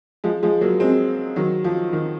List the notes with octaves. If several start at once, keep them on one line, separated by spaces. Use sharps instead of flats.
F3 G#3
F3 G#3
F#3 A#3
G#3 C4
D#3 F#3
F3
D#3